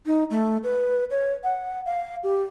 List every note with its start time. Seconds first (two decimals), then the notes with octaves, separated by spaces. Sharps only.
0.06 D#4
0.30 A3
0.63 B4
1.11 C#5
1.44 F#5
1.86 F5
2.24 G4